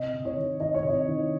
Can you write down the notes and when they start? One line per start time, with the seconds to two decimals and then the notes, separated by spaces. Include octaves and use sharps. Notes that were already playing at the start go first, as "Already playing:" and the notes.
Already playing: C3 D#5
0.13 C3
0.25 C#5
0.37 D#3
0.60 D#3 D#5
0.74 C#5
0.84 C3 D#5
1.08 D#3